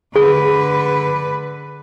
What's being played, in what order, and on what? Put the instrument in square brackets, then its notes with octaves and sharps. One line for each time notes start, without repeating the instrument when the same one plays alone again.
[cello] D3 B4 [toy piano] G#4